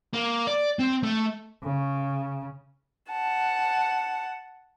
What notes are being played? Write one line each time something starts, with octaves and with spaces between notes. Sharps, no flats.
A#3
D5
C4
A3
C#3
F#5 A5